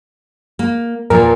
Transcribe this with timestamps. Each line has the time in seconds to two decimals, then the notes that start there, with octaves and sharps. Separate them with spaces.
0.59 A#3
1.10 E2 A#2 F3 A#4